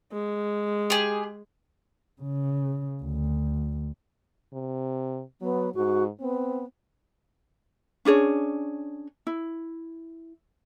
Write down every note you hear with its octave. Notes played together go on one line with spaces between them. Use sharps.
G#3
G4 G#4
C#3
D2
C3
F#3 B3
G#2 F#4
B3 C4
C#4 D4 G#4 C#5
E4